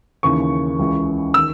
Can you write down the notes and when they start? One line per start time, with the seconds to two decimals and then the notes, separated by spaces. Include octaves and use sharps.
0.23 D#2 C#3 E3 C#6
0.79 C#2 C#3 E3
1.34 D#3 E6